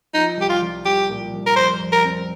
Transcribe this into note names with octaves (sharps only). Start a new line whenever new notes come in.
F3 D#4
C2 G4
F4
C2
C2 G4
A#2
C2
A#4
F2 C5
F2
A#4
C4